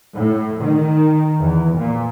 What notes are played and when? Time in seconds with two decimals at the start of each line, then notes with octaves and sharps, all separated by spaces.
0.16 A2
0.64 D#3
1.40 E2
1.77 A#2